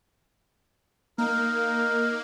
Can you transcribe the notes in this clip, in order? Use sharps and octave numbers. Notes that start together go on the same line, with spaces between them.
A#3 D#4 A#4